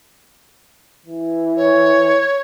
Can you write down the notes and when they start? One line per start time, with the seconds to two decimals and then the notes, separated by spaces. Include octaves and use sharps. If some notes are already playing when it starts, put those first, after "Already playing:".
1.06 E3
1.57 C#5